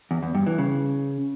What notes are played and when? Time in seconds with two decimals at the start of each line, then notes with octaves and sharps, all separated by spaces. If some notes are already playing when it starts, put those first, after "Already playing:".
0.11 E2
0.23 E2
0.35 G2
0.46 E3
0.58 C#3